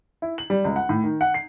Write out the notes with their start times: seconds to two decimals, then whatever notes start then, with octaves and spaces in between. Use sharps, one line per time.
0.22 E4
0.38 F#7
0.50 G3
0.64 C#2
0.76 F#5
0.89 A2
1.04 D#3
1.21 F#5
1.34 C7